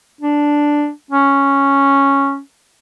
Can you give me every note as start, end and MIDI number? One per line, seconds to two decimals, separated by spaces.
0.21 0.90 62
1.11 2.39 61